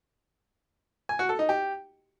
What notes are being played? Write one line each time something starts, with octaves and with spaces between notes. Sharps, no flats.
G#5
F#4
A4
D#4
G4